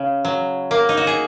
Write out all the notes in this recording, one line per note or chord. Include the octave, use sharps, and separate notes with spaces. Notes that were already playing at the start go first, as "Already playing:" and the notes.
Already playing: C#3
F#3
A#3
D#4
F#4
G#4